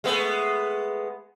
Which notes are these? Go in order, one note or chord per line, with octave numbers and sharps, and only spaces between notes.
G#3 A3 B3